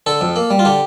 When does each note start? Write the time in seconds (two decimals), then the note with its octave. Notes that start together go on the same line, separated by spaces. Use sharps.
0.06 D3 A4
0.21 F2
0.36 A#3
0.50 G3
0.59 F4
0.65 D3 G4